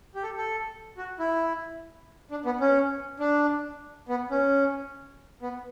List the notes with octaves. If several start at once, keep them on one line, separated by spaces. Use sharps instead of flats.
G4
A4
A4
F#4
E4
D4
B3
C#4
D4
B3
C#4
B3